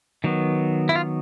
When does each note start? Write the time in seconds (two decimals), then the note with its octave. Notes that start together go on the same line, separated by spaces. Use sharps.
0.24 D#3 F#3 B3
0.89 E4
0.95 F4